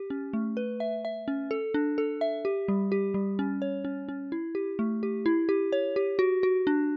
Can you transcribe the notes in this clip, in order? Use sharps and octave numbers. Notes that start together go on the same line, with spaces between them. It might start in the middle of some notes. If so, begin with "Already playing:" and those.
Already playing: G4
C#4
A3
B4
E5
E5
C#4
A4
D4
A4
E5
G4
G3
G4
G3
C#4
C#5
C#4
C#4
E4
G4
A3
G4
E4
G4
C#5
G4
F#4
F#4
D4